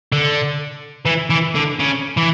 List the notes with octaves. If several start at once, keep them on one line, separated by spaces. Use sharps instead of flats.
D3
E3
E3
D3
C#3
E3